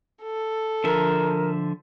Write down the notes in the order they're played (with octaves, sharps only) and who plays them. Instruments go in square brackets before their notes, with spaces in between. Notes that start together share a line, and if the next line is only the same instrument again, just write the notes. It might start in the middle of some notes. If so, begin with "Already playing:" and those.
[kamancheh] A4
[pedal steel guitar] D3 F3 E5 [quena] A#4